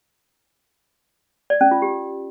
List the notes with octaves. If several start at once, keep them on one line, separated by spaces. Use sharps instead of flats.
D5
C#4
F4
G4